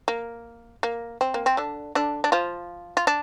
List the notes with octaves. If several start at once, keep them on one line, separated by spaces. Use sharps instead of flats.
A#3
A#3
C4
A#3
C4
D3 D4
D3 D4
D4
F3 F4
F4
D4